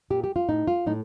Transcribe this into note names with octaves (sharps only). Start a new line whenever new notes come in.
A#2 G4
G4
F4
A2 D#4
F4
A2 D#4